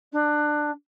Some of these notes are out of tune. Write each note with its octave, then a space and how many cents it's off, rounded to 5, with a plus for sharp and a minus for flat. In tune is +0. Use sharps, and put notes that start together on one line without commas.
D4 +20